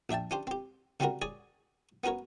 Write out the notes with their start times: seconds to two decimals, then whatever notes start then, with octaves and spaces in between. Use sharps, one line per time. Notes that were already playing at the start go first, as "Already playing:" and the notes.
0.09 A#1 D4 E5 G5 A5
0.31 C#4 D4 G4 C5
0.47 C4 G4
1.00 C#3 G3 C4 C#4 F#4 A#4
1.22 G#4 C#5 D5 G#5
2.04 B3 C#4 F#4 A#4 C#5